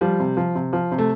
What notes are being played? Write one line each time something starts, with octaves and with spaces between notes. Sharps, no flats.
F3 G3
C3
F3
C3
F3
C3
A3